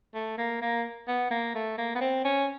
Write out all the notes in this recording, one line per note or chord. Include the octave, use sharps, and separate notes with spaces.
A3
A#3
A#3
B3
A#3
A3
A#3
B3
C4
C#4